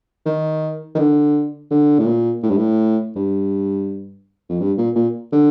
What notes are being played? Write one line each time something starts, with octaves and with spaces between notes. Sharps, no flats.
D#3
D#3
D3
D3
A2
A#2
A2
G2
A2
G2
F2
G2
A#2
A#2
D3